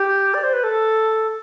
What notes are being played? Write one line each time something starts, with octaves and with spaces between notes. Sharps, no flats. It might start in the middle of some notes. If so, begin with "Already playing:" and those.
Already playing: G4
D5
C5
B4
A4